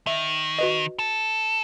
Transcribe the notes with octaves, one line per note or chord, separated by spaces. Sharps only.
D#3 E5
F#4 B4 D#5
A4